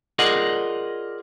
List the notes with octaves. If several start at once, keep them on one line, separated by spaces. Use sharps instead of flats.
F4 G#4 A#4 D5 D#5 F#5